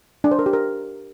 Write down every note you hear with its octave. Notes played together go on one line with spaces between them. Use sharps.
D4
C5
A#4
G4
A#4